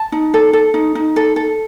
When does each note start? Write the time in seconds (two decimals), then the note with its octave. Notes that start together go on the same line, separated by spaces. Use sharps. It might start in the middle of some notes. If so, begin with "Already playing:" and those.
Already playing: A5
0.12 D#4
0.34 A4
0.53 A4
0.74 D#4
0.95 D#4
1.16 A4
1.36 A4